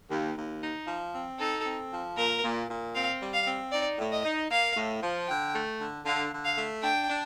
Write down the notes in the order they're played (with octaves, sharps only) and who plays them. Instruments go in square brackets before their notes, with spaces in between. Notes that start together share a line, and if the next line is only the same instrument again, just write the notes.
[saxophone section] D#2
D#2
D#4
F3
C4
[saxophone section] D#4 [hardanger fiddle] A4
[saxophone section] C4
F3
[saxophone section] A#2 [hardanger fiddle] A#4
[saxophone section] A#2
A#2
[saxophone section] C4 [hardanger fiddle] F5
[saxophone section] G3
[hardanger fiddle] F5
[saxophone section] C4
[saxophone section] D#4 [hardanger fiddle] D5
[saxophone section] A2
[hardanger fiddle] D#5
[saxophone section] D#4
[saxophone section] A#3 [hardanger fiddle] F5
[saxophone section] A2
F3
[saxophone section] D3 [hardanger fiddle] G5
[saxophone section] A3
D3
[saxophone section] D3 [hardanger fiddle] F5
[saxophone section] D3
[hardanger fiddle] F5
[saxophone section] A3
[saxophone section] D4 [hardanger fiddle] G5
[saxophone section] D4